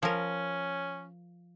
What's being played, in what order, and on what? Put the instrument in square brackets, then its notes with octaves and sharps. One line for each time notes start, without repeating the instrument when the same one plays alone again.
[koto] F3 A#4 [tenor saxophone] C#4